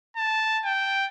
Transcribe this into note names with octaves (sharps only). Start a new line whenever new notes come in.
A5
G5